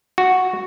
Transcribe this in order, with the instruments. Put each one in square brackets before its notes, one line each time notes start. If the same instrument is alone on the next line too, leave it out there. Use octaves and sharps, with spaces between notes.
[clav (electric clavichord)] F#4